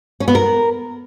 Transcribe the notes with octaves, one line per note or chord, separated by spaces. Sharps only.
C#4
B3
A#4